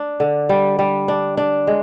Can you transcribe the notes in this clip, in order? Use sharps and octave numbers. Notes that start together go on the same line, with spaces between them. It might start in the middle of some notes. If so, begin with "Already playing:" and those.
Already playing: D4
D3
G3
G3
D4
D4
G#3